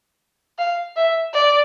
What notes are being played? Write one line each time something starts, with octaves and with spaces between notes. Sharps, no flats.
F5
E5
D5